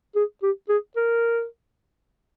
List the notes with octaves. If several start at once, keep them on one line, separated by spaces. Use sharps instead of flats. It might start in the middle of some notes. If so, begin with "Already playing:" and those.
G#4
G4
G#4
A#4